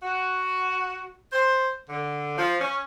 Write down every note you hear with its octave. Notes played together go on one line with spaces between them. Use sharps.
F#4
C5
D3
F3
C#4